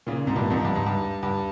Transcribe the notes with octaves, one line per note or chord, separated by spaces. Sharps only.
A#2 C#3
G#2 C3
G2 A#2
F2 G#2
G2
G#2
G2
G2